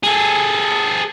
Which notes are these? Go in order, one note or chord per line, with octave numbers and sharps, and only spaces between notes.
G#4 A4